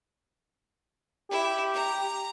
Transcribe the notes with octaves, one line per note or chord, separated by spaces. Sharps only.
E4 G4
A#5